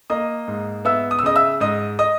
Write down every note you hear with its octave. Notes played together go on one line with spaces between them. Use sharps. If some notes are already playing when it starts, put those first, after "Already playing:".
A#3 D#5 D#6
G#2
B3 E5 E6
D#6
E6
C#3 D#5 D#6
E5 E6
G#2 D#5 D#6
D#5 D#6